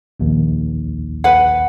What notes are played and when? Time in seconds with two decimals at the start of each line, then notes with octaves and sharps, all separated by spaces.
0.20 A#1 D#2
1.24 B4 F#5